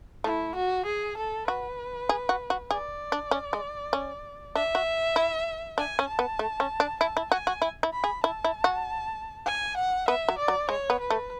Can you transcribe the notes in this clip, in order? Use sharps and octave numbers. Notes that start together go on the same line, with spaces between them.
A3 E4
F#4
G#4
A4
F#4 B4
G#4
F#4
F#4
G#4 D5
D4
C#4
G#3
C#4
D4 E5
F#4
E4
D4 G#5
C#4
A5
B3
A3
C#4
D4
E4 A5
E4
F#4 G#5
F#4
E4
E4
B5
G#4
E4 A5
E4
F#4
G#5
F#5
B3 E5
F#3
D5
F#3
G#3 C#5
B3
B4
A3